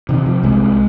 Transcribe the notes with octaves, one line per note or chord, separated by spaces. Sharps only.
C3 D#3
F3
C2 G#3